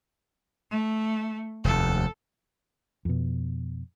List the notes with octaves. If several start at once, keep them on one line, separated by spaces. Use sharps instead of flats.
A3
F1 D#2 A4
F2 B2